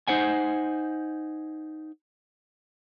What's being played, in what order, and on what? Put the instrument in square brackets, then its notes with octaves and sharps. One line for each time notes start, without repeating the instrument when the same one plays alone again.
[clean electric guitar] D#4 C5 F#5 G#5